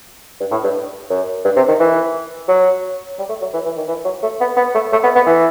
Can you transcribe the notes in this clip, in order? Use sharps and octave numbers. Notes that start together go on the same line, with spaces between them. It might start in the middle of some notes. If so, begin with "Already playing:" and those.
G2
A2
G2
F#2
G2
C3
D#3
E3
F#3
G3
A3
F#3
E3
E3
D#3
E3
F#3
A3
B3
B3
A3
A3
B3
B3
E3